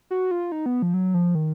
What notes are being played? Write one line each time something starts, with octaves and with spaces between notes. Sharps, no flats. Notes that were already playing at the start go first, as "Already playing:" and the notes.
F#4
F4
D#4
B3
F3
F#3
F3
D#3